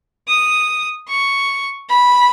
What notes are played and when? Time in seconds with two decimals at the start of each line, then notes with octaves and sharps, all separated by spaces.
0.28 D#6
1.09 C#6
1.89 B5